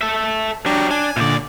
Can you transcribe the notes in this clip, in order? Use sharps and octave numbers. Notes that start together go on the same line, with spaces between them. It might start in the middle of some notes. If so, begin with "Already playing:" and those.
A4 E5
F#3 D4 G4
D4 G#5
D2 A#2 D3 D5